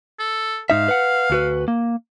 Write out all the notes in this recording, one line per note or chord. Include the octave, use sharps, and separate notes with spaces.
A4
G#2 D#4 E5 F5
B4 F#5
D2 F#4 B4
A#3